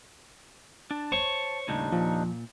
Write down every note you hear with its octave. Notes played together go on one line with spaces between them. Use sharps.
D4 A5
C5 C#5 C#6
D#2 A2 C#3 G3 D4 D#4
A#2 F3